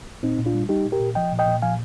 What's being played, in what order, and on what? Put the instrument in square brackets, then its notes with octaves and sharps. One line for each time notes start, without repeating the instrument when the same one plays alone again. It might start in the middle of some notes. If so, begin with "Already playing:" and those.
[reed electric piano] A#2 C4 D#4
A#2
D4 F4
G3
G3 D#4 G4
A#2
G4 A#4
A#2
F3 D#5 G5
A#2
D#5 G5
A#2
F3 F5 G#5